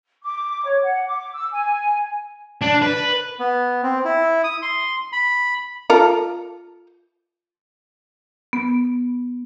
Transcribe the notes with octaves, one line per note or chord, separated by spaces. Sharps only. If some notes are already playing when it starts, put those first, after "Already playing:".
D6
C#5
F#5
D6
E6
G#5
D4
B4
B3
C4
E4
D#6
C6
B5
F4 A4 A#4
B3